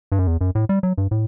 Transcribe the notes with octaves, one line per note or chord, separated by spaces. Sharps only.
G2
F#2
E2
F#2
A2
G3
F#3
G2
A2